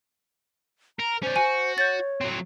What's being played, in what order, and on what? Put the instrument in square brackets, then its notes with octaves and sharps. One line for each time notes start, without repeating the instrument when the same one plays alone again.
[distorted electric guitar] A#4 [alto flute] A#5
[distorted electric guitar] C#4 D5 [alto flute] C5
[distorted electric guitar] F#4 [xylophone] G#5
[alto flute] C#5 [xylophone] G6 A6
[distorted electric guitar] F#3 C4